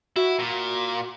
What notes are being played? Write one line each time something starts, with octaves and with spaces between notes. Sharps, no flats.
E4 F#4
A#2